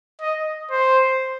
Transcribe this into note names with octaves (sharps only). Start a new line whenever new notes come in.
D#5
C5